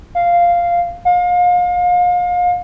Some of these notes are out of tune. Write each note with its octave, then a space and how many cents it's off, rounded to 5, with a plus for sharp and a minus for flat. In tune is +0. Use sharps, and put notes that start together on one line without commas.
F5 -5
F5 +35